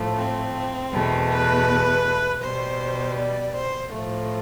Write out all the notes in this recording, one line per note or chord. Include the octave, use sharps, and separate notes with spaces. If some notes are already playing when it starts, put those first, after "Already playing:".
Already playing: A2 F3 A3
C4
E2 B2 A3
B4
B2 G3 C5
D5
C5
A2 F3 A3